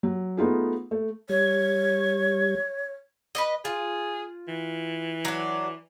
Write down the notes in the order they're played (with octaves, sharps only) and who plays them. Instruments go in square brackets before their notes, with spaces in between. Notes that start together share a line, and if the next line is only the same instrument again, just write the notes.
[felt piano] F#3
A3 B3 D#4 F4 G#4
A3
[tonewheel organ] G3 G#6 [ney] C#5
[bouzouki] B4 C5 D#5
[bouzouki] F4 [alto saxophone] G#4
[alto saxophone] E3
[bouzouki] F#3 D4